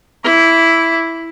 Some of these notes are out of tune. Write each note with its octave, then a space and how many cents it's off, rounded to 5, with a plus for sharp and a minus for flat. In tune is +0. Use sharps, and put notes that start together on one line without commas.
E4 +0 D6 -30